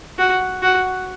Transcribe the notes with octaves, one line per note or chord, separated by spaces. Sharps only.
F#4
F#4